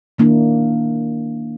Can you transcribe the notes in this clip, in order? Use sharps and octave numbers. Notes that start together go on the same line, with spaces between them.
D#3 A#3 D4 E4